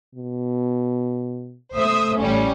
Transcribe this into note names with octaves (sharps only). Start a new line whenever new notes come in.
B2
A3 C5 E5 D#6
A1 G3 C#4